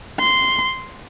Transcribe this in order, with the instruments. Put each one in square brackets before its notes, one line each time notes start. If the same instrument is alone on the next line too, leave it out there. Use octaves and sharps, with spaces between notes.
[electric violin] C6